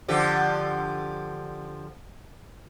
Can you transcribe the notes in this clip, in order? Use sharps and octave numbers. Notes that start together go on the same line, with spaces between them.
D3 F3 G4